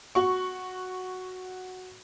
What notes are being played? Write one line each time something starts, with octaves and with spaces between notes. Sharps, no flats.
F#4 C#6